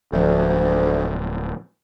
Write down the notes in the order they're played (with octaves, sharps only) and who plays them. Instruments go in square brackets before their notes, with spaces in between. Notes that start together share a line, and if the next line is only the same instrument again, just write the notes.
[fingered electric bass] D1 F3 [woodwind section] D2